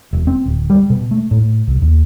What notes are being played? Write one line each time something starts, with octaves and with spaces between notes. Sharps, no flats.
E1
C4
D1
G3
B2
A3
A2
C2
D#2